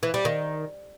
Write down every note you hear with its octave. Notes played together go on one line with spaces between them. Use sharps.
E3
G3
D#3